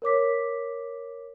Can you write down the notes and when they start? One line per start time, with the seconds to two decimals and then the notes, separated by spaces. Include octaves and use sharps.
0.02 A#4 C#5 D6 B6